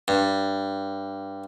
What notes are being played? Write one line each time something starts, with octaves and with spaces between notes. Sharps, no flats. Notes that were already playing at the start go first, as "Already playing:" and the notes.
G2